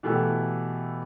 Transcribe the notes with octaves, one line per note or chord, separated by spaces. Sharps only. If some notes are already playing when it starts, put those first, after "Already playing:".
B2 E3 A3 G4 A4